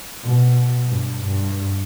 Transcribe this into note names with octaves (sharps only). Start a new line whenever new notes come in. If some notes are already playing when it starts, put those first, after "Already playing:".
B2
G2
G2